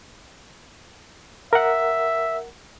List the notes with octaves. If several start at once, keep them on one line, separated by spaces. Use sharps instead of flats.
A#4 E5 F#5